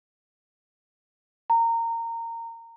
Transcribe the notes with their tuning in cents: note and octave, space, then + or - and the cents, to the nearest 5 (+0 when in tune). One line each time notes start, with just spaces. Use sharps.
A#5 -20